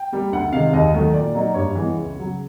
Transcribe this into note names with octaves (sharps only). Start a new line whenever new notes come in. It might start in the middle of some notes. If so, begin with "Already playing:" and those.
Already playing: G5
G3 A#3
D2 F#5
C3 D#3 G#3 C4 F5
D#2 D#5
D#3 F#3 A3
A#2 D5
F#3 A#3 D#4
G2 C#5
E3 G#3 B3
C#2
C#3 F#3